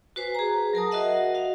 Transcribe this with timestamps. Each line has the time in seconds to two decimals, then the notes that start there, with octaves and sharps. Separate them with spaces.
0.16 F#4 B4 C5 G#5
0.35 G#4 A#5
0.73 F#3 A#4 A5 D#6
0.91 F#4 A#4 C5 D#5 E5 F#5
1.34 F#4 F5